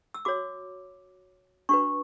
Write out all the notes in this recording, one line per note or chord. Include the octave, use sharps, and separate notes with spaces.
E6
F#4 C#5 D6
D4 F#4 B4 C#6